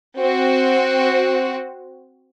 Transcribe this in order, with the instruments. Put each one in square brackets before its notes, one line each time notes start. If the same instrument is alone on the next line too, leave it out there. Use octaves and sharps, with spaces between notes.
[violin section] C4 F#4